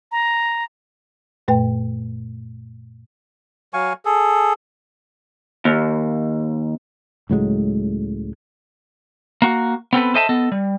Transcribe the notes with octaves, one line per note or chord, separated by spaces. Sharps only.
A#5
F#2 A#2 A3 B4 G5
F#3 F5 G#5 C#6
G#4 A4
D#2
C#2 A2 F#3 G#3
A#3 F#4
B3 C4 A4 B4
A4 C5 D#5 E5 G#5 A5
B3 A4 D#5
G3